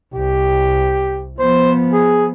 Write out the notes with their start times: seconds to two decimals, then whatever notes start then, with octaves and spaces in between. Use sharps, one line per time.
0.14 C2 G4
1.39 F3 B3 C5
1.93 G#4